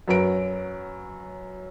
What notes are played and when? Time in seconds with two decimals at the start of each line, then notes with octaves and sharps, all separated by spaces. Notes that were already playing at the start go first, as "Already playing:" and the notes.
0.08 F#2 F#3 B4 A#5 D7